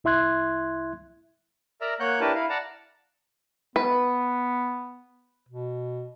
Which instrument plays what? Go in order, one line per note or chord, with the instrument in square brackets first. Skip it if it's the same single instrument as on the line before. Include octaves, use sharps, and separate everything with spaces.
[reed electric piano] C2 E4 E5 C6 F#6 G#6
[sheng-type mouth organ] A#4 D5 E5 A#5
A#3 C#5 F#5 F#6 G6
D4 E4 G4 A#4 B4 A5
E4 F5
D5 F#5 A5 A#5
[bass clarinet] B3 [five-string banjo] B4
[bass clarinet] B2